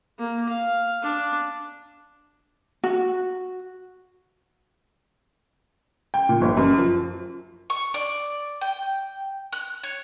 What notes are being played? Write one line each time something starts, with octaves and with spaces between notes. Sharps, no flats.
A#3
F5
D4
F#4
G5
A#2
G1
F#2
F3
C#6
D5
G5
F#6
C#5